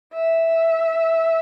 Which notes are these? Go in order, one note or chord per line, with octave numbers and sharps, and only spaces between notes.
E5